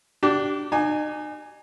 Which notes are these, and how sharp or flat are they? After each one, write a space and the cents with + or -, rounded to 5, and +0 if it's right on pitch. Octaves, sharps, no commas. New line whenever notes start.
D4 +0 G4 -25
D#4 -40 G#5 +0